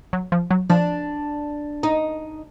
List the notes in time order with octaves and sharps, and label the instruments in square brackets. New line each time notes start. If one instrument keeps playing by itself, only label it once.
[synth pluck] F#3
F3
F#3
[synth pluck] F3 [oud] D4
[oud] D#4